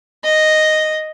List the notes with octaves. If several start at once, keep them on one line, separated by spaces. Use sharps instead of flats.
D#5